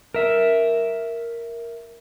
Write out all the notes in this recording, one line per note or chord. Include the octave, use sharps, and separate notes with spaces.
A#4 E5